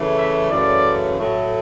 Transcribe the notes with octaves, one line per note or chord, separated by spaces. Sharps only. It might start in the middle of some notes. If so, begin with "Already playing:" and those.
Already playing: C#3 E3 A3
E5
F#2 C#3 E3 A3 D5
A2 F#3 A3